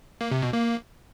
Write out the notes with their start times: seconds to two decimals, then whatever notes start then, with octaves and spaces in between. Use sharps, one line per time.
0.21 A#3
0.32 C3
0.42 B2
0.53 A#3